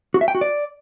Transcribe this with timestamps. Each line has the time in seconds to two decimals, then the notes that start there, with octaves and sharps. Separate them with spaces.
0.14 F#4
0.21 E5
0.28 G5
0.35 F#4
0.41 D5